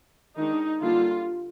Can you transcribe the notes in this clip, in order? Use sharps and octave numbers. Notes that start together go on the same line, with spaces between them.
D#3 G#3 D4 D#4
D3 G3 A#3 D4 F4